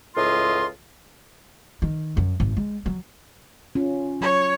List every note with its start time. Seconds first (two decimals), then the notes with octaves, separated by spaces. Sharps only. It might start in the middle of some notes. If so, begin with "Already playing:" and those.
0.16 C#2 A2 F4 D#5 C6
1.82 D#3
2.17 F#2
2.40 G#1
2.57 G#3
2.86 F#3
3.75 C#4 F4
4.21 F#3 C#5